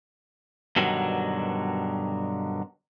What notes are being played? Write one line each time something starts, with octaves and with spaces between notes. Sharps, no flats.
G2 B2 D3 D#3 F#3